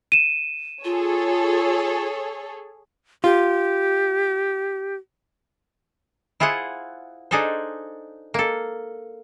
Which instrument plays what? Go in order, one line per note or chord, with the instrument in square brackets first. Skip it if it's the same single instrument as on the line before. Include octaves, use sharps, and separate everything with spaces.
[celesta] D#7 E7
[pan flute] F4 [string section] G#4 A4 C#5
[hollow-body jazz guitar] F4 [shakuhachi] G4
[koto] E4 F4 G#4 C5 F#5
D4 D#4 G#4 A4 C5
A#3 A4